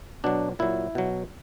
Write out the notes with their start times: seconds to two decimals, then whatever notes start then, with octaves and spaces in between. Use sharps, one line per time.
0.24 B2 F#3 D4
0.59 A#2 F#3 E4
0.95 B2 F#3